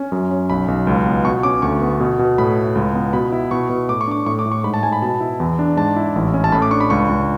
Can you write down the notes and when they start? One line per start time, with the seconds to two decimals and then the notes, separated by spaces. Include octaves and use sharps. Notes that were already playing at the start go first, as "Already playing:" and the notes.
Already playing: C#4
0.12 F#2
0.31 C#4
0.50 B1 B5
0.68 B1
0.87 C#2
1.06 B3
1.25 B2 C#6
1.43 C#4 D6
1.62 D2 C#6
1.82 B3
2.00 B2
2.19 B2
2.38 A2 B5
2.57 E4
2.75 C#2
2.94 B3
3.13 B2 B5
3.32 E4
3.51 B2 C#6
3.69 B2
3.89 A2 D6
4.01 C#6
4.07 D4 D6
4.26 A2 C#6
4.39 D6
4.46 A2
4.52 C#6
4.64 G#2 B5
4.74 A5
4.83 G#2 G#5
4.93 B5
5.02 B2 A5
5.20 E4
5.40 E2
5.59 D4
5.77 G#2 A5
5.96 E4
6.16 A1
6.34 C#4
6.44 A5
6.52 A2 B5
6.62 D6
6.71 D4 C#6
6.81 B5
6.90 C#2 C#6
7.09 C#2